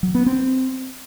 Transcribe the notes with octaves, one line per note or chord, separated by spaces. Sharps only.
F#3
B3
C4